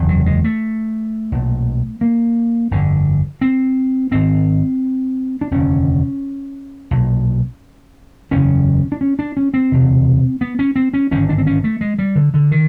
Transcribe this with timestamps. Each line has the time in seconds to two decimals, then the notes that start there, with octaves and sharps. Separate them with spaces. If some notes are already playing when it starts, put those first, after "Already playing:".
Already playing: F#1 E2 C3
0.09 F#3
0.26 G#3
0.44 A3
1.32 B1 A#2
2.01 A#3
2.71 G1 F2 D3
3.41 C4
4.11 G#1 G#2 C4
5.41 D4
5.51 F1 D#2 D3 C#4
6.91 B1 A#2
8.31 F#1 E2 C#3 C#4
8.92 D4
9.01 C#4
9.19 D4
9.37 C#4
9.54 C4
9.72 E1 D2 C3
10.41 B3
10.59 C#4
10.76 C4
10.94 C#4
11.11 G#1 G2 D3 C#4
11.29 D4
11.38 C4
11.47 C#4
11.64 A3
11.81 G#3
11.99 G3
12.16 D3
12.34 D3
12.51 D#3